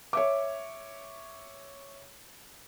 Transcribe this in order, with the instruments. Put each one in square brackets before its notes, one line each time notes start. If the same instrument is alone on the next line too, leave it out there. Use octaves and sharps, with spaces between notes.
[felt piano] C#5 E5 D6